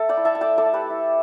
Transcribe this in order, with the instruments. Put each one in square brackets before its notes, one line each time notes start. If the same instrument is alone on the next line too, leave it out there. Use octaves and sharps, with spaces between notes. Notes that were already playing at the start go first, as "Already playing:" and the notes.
Already playing: [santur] A3 A4
D5 G5
E4
E5 A5
A5
A3 D5 G5
A4 D5
A3
G4 B4
E4